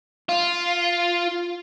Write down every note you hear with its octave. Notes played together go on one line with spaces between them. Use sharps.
F4